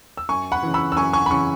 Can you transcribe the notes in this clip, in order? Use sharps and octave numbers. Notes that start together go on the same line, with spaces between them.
E6
F#2 G#5 C#6
F#5 B5
C#3 E3
B5 E6
E6
F#2 G#5 C#6
G#5 C#6
B5
C#3 E3 G#5 C#6